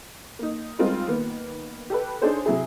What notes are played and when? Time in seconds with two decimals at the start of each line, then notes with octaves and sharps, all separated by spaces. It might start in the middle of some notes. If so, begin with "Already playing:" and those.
0.39 A#3 D#4
0.79 G3 G#3 C4 D#4 F4 A#4
1.08 D#3 A#3 B3
1.90 G4 A4 B4
2.22 D4 D#4 G#4 A4 C5 C#5
2.46 C3 F#3 E4 G#4